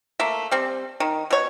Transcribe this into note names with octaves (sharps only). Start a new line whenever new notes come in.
A3 A#3 E5
G3 C4
D#3
B2 C#5